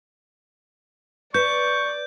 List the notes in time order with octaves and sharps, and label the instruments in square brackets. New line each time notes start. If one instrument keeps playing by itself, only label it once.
[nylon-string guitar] B4 [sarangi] D5 [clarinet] C#6 [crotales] G6